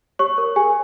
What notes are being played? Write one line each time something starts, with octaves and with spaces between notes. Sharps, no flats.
G4 C#5 C#6
A#4 C#5
G4 G#4 G#5